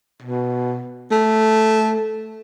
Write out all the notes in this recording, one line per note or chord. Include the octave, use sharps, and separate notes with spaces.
B2
A3